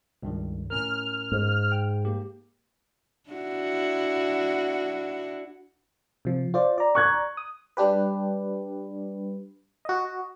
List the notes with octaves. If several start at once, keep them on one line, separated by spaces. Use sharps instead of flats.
C#2 G2 D#3
A2 C#4 A#4 F6
G#2
G5
A#3 G4
D4 E4 F#4
C3 F3
F4 C5 D5
D5 A#5
C#6 F#6 G#6
D#6
G3 D4 G4 B4
F#4 D#5